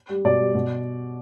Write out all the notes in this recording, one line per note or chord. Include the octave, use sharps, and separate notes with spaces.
G3
B2 D5
G3
B2